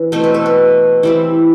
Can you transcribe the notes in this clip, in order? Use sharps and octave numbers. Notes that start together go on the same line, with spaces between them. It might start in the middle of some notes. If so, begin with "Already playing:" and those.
Already playing: E3
B2 A3 C4 C5
B4
A4
B4
E3 G3 C4 E4